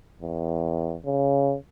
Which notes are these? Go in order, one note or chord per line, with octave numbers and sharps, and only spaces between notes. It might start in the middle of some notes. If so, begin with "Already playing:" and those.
E2
C#3